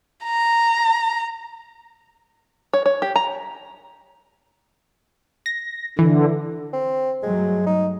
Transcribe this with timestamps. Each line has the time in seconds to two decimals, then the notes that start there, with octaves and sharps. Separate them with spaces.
0.24 A#5
2.74 C#5
2.86 C#5
3.02 G4
3.16 A#5
5.46 A#6
5.99 D3 E3
6.73 C4
7.23 G2 F#3 G#3 A3
7.66 D#4